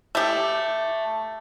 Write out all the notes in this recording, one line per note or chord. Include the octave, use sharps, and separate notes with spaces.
A3 G4